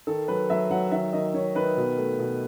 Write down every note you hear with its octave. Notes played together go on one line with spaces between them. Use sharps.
D#3 A4
F#3 B4
F#3 E5
F#3 F#5
D#3 E5
D#3 D#5
D#3 C#5
D#3 B4
B2
A3
B2